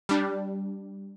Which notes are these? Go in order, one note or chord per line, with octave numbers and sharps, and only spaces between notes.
G3 D4